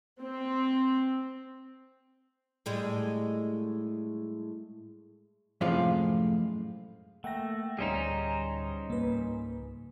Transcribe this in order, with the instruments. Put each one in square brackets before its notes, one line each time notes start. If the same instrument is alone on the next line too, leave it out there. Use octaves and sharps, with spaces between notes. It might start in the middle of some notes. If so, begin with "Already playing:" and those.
[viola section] C4
[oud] A2 G3 G#3
[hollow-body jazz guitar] F#2 A2 C3 F3 G#3 F4
[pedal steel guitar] A3 [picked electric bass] A#3 [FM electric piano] F#5 G5 A#6
[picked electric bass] D1 G#1 [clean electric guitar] G3 C#4 D#4 [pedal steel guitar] G#4 C5 A#5
[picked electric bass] C#2 G#2 [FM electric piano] A#3 B4